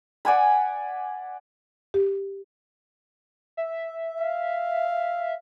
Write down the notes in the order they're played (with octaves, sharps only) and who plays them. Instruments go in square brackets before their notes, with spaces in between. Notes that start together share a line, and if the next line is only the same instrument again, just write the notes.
[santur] D5 F#5 G#5 B5
[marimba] G4
[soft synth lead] E5
[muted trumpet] F5